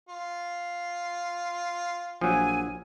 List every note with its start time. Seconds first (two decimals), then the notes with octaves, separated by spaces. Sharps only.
0.09 F4
2.21 A#1 F3 F#3 G#5